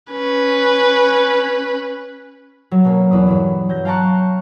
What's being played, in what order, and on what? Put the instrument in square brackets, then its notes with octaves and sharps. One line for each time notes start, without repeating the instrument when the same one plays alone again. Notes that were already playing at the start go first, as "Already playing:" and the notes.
[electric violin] C#4 B4
[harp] F#3
B2 A#3 C#4
E2 B2 B4 D#6
G2 E3 F#3
F#3 G6 A#6
F5 G5 A5 A#5 C#6 F#6